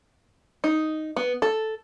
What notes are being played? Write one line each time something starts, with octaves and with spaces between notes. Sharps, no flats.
D#4
B3
A4